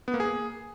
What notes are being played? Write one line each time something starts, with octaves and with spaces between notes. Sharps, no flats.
B3
A#3
G#4